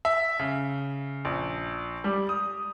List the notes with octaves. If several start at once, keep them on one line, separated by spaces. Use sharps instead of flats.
E5
C#3
A#1
G3
D#6